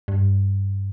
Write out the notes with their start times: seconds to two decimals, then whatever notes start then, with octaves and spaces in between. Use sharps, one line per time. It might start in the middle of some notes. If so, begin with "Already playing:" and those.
0.08 G2